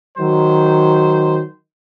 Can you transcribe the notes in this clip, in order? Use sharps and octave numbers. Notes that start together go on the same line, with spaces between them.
D#3 F#3 C5